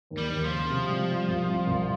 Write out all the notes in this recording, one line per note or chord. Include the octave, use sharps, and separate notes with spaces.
D#2
G3
D#2
F3
C#3
C3
G3
G3
C2
C4
C2